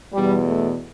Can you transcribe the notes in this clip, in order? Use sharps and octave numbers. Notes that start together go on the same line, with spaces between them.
E2 B2 G3
A3